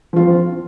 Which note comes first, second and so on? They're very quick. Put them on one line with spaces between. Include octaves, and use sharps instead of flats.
F3 F4 C4